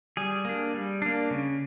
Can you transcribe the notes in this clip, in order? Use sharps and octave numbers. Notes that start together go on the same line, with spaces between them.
G3 G#4
A#3 D4
G3
A#3 D4
C#3